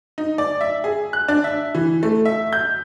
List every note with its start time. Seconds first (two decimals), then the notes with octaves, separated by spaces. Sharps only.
0.18 D#4
0.38 D5
0.61 E5
0.84 G#4
1.13 F#6
1.28 D4
1.44 E5
1.75 E3
2.03 A3
2.25 E5
2.53 G6